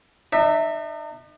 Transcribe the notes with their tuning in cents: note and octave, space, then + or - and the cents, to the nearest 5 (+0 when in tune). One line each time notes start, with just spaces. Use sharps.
D#4 -45 E5 -10